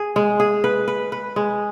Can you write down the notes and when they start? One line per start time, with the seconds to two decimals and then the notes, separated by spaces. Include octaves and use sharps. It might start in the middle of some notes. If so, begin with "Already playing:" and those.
Already playing: G#4
0.16 G#3
0.40 G#4
0.64 B4
0.88 B4
1.12 B4
1.36 G#3